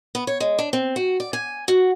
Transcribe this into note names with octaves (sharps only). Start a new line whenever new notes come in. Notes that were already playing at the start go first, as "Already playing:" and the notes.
B3
C#5
G#3
D4
C4
F#4
D5
G#5
F#4